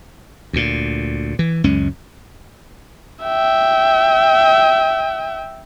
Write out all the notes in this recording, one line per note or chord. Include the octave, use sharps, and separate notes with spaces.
D2 A#2
E3
C#2 F#2 G#3 C#4
E5 G5